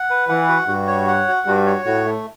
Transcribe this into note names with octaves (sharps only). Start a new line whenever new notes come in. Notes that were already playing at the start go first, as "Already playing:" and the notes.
Already playing: F#5
B4
E3 F#5
F#4
G2 F#4
C#5
F#5
F#4
G2 F#4
C#5
A2 F#4
A3